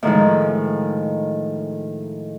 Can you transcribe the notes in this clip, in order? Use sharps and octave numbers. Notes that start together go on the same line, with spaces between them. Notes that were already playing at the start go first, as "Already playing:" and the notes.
A2 D#3 F3 G#3